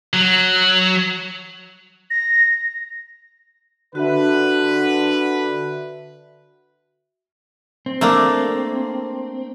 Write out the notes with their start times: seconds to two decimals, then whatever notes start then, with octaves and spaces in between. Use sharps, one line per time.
0.13 F#3
2.11 A#6
3.95 D3 F#4 B4 E5
7.86 C4
8.01 A3 A#3 D4